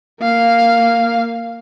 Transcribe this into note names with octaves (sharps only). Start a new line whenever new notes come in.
A#3 F5